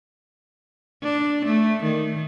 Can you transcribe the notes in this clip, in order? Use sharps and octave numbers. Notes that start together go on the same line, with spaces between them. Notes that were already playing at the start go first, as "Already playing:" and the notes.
D4
A3
D#3